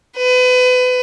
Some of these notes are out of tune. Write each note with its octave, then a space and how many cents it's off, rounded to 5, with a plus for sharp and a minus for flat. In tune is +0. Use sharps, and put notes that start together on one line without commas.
B4 +30